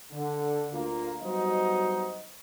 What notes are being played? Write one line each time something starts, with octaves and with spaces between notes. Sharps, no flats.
D3
D2 A#3 F4
F#3 G3 B3 D#4 C5 D#5